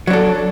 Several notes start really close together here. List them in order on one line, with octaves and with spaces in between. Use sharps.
F#3 D4 A4